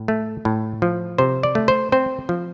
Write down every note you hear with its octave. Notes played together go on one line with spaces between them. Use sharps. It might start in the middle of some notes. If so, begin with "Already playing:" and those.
Already playing: A2
A3
A2
F3
C3 C5
D5
A3
C5
C4 C5
F3